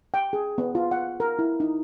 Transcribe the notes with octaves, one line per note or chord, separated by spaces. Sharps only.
G5
G#4
B3
F4
F#5
A#4
E4
D#4